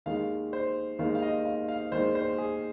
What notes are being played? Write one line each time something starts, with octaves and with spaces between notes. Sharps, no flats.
D#2 D#3 G#3 F5
C5
D#2 D#3 G#3 F5
F5
D#5
F5
F5
D#2 D#3 G#3 C5
C5
G#4